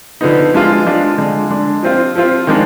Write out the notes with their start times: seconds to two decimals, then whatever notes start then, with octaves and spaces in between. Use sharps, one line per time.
0.21 D3 F3 B3 D#4
0.53 F3 G#3 D4 F4
0.86 F3 G#3 D4 F4
1.18 D3 G#3 D4
1.51 D3 G#3 D4
1.83 F3 C4 F4
2.15 F3 C4 F4
2.47 D#3 G#3 D4